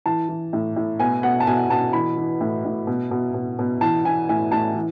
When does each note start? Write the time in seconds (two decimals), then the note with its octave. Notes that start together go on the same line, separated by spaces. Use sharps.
0.06 E3 A5
0.29 E3
0.53 A2
0.76 A2
1.00 B2 G#5
1.23 B2 F#5
1.40 A5
1.47 B2 G#5
1.70 B2 A5
1.93 E3 B5
2.17 E3
2.41 A2
2.65 A2
2.87 B2
3.11 B2
3.34 B2
3.59 B2
3.81 E3 A5
4.05 E3 G#5
4.29 A2 G#5
4.52 A2 A5
4.75 E3